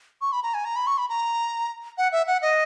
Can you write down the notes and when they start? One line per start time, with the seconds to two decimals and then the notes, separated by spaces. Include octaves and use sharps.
0.21 C#6
0.32 B5
0.43 A#5
0.54 G#5
0.65 A#5
0.76 B5
0.87 C#6
0.98 B5
1.09 A#5
1.98 F#5
2.12 E5
2.27 F#5
2.42 D#5